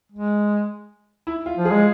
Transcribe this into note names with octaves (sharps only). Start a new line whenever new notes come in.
G#3
E4
F4
F3
G#4
G#3